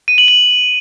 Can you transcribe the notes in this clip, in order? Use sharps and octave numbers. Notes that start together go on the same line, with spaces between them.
D#7
F#7
F#7